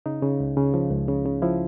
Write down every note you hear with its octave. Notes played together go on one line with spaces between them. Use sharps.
C#3 D#4
C#3
C#2
C#3
F3
C#2
C#3
C#3
F3 E4